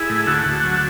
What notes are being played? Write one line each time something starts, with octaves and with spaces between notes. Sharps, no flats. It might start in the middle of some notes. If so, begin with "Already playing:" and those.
Already playing: E4 G#4
A2
D2 F#4 A4
D2
F#3